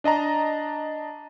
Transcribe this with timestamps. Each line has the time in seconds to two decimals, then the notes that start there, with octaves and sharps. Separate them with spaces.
0.04 D4 D#5 A5 A#5